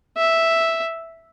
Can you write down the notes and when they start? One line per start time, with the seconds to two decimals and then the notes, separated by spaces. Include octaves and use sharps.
0.17 E5